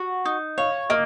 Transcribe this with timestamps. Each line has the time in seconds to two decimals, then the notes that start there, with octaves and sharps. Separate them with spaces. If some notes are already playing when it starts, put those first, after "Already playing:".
Already playing: F#4
0.25 D#4
0.58 C#5 F5
0.90 A#3 D#5